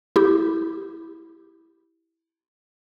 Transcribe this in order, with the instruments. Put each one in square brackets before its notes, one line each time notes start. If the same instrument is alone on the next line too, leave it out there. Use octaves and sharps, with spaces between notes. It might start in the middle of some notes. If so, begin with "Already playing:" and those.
[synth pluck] E4 G4